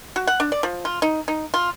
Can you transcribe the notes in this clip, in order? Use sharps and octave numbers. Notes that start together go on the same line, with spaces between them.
F#4
F#5
D4
D5
F3
F4
D#4
D#4
F4